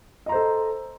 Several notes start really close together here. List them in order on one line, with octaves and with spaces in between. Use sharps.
D#5 A#5 C5 A4